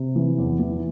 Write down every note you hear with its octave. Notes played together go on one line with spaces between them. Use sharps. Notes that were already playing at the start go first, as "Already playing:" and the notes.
Already playing: C3
E3
E2
E3